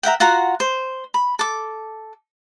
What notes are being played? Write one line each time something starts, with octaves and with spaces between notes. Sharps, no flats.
A#4 E5 F#5 G5
F4 F#4 F#5 A#5
C5
B5
A4 D6